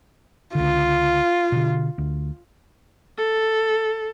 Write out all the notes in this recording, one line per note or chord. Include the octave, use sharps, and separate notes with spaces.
C#2 D3 F4
B2 D3
D2
A4